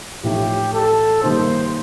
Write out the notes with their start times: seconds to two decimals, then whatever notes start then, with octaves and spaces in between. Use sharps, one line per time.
0.23 A1 A2 F3 A3 D#4 G4
0.74 A4
1.23 G2 D#3 A#3 D#4 C5